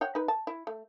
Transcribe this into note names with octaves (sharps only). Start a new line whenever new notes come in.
C#5 F#5 G5
D#4 B4
A5
E4
A3